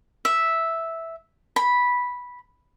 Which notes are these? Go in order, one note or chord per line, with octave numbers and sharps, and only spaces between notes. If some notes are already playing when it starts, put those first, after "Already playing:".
E5
B5